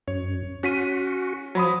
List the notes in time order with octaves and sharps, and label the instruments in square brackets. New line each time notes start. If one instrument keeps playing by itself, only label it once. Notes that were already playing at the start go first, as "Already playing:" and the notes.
[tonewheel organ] F#2 [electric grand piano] C#5
[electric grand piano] C#4 B6 D#7 [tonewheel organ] F#4
[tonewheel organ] F3 [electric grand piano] F#3 B5 D#6